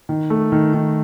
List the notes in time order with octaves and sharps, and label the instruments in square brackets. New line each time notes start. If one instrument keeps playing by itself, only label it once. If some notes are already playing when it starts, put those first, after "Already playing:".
[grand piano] D#3
A3
D#3
D#3